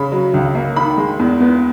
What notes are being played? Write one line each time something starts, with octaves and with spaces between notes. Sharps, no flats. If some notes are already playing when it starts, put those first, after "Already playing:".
Already playing: C#3 B5
F#3
C#2
A#3
D#3 B5
G#3
E2
B3